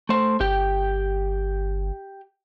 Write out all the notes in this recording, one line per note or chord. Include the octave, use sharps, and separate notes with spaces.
A3 C5
G1 G4 G5